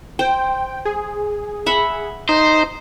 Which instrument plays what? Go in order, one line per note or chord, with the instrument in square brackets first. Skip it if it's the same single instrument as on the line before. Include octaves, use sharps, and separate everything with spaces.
[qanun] C5 [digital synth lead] G5
[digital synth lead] G#4
[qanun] E5 F#5 B5
[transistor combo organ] D#4 [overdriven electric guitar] C5